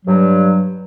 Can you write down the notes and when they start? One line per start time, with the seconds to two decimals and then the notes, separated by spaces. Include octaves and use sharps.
0.06 G2 F#3